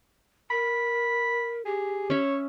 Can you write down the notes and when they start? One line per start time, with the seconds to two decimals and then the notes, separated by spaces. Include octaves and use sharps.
0.51 A#4 B5
1.65 G4 G#4
2.10 C#4 C#5 E5